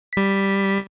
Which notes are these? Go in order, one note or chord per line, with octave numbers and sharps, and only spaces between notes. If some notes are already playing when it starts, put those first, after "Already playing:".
G3 B6